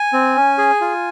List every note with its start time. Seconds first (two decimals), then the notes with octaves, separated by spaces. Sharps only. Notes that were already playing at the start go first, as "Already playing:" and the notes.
Already playing: G#5
0.13 C4
0.36 C#4
0.58 G#4
0.81 F4